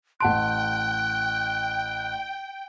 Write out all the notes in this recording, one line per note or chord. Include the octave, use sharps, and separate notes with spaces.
A1 F#5 G5 A5 C6 F#6 D7